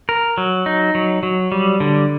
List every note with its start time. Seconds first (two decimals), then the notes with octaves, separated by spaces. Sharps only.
0.09 A#4
0.38 F#3
0.66 D#4
0.95 F#3
1.23 F#3
1.52 G3
1.80 D3